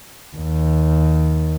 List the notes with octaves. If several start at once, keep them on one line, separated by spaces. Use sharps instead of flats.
D#2